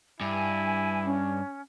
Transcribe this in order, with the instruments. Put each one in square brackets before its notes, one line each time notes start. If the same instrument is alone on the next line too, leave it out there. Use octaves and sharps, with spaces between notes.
[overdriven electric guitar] G2 [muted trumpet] E4 [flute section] G#5
[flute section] C#4